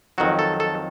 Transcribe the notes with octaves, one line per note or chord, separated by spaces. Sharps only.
F2 D#3 F#3 F#4
A4
A4